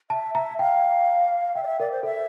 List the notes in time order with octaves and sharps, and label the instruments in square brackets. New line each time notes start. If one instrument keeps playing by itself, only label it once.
[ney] E5 [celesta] A5
[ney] E5 [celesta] A#5
[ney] F5 [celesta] G5
[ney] E5 [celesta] G5
[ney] D5
E5
[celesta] A#4 [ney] D5
[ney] C5
[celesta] A4 [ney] E5